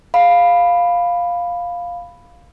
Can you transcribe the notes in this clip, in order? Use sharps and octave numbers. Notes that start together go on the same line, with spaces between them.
F5 B5